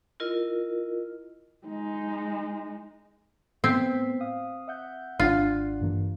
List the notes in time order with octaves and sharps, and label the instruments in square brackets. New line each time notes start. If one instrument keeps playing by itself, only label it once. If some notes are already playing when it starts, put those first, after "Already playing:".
[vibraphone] E4 F4 A#4 D#5
[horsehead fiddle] G#3 D#4
[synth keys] A2 B3 B6 [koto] C4
[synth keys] F5 D#6
E5 F#5 G6
[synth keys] G#1 D4 F#5 [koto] F4
[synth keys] G2 E3 A#3